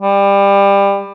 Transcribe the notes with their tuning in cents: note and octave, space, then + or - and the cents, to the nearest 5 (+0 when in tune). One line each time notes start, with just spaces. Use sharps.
G3 +25